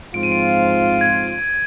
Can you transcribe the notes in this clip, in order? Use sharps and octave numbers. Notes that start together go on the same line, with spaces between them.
G#2 F3 C4 F4 D7
D#7
D7
G#6